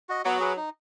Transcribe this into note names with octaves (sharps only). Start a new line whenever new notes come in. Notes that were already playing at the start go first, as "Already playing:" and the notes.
F#4 D#5
F#3 B3
G#4 B4
D#4